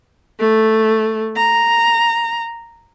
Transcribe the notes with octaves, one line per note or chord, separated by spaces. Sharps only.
A3
A#5